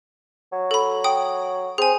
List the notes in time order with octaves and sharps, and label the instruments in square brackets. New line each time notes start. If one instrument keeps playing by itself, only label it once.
[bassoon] F#3
[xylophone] A4 B5
G5 D#6
[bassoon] C4 [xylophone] G#4 G#5